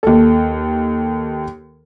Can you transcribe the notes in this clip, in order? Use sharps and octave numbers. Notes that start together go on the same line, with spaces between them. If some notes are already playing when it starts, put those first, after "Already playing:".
D#2 A4